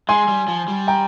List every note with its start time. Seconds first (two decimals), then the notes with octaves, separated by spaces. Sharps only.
0.09 G#3 G#5 C6
0.28 G3
0.48 F3
0.68 G3
0.87 G5 A#5